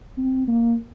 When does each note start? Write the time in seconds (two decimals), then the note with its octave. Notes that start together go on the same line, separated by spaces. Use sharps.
0.18 C4
0.47 A#3